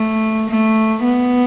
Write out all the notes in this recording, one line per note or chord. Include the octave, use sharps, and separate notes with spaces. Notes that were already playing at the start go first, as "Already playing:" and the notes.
Already playing: A3
A3
B3